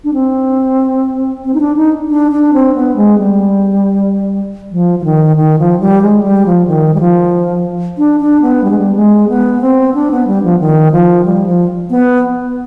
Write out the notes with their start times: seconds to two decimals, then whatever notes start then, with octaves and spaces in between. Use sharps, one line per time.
0.04 D4
0.14 C4
1.45 C4
1.54 D#4
1.60 D4
1.77 D#4
2.10 D4
2.32 D4
2.53 C4
2.75 B3
2.96 G#3
3.18 G3
4.71 F3
4.99 F3
5.04 D#3
5.37 D#3
5.59 F3
5.80 G3
6.02 G#3
6.23 G3
6.46 F3
6.67 D#3
6.94 G3
7.00 F3
7.98 D4
8.20 D4
8.42 B3
8.64 G3
8.71 G#3
8.79 G3
8.96 G#3
9.29 B3
9.61 C4
9.94 D4
10.11 B3
10.27 G3
10.44 F3
10.59 D#3
10.92 F3
11.25 G3
11.46 F3
11.90 B3